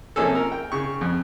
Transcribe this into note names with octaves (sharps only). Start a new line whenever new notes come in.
C3 F3 A#3 C#4 G#4 A4
A#4
G5
C#3 C#6
F2